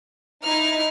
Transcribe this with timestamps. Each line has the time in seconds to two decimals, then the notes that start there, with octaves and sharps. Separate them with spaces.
0.43 D#4 E4 F6